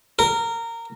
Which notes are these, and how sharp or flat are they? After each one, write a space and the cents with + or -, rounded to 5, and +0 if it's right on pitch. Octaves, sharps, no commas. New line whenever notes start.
A#4 -15